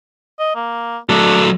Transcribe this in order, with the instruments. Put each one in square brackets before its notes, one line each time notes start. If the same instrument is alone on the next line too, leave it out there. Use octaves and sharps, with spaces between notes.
[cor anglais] D#5
A#3
[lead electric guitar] F#3 A3 [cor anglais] D4